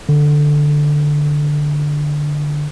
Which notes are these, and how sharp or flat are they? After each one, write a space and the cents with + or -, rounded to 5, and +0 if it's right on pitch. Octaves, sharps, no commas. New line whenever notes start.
D3 +5